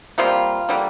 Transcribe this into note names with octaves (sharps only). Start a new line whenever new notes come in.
C3 G3 A#3 F4
D3 G3 A#3